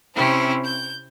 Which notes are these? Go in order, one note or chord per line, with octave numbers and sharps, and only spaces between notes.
C3 C4 C#4 E4 C5
G6